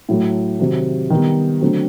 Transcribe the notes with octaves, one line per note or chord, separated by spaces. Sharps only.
A2 F#3 A3
C3 D#3 F#3
D#3 G3 B3
D3 F#3 A3 C4